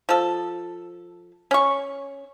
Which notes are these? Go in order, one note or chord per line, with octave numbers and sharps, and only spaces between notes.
F3 A4
C#4 C#6